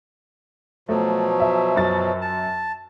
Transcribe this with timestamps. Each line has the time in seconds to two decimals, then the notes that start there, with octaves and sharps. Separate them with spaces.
0.89 B2 F3 F#3 A3
1.40 E5
1.76 F#2 A6
2.21 A5